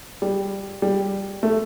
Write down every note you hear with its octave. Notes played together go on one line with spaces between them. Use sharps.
G3
G3
A3